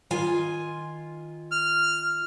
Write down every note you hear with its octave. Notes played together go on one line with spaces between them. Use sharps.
D#3 F4 G#5
F6